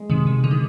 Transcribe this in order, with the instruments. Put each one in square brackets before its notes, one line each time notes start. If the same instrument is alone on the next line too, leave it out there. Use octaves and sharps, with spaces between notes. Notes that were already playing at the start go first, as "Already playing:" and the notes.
Already playing: [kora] G#3
[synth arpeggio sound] C3 D#3
C3
D3
D#3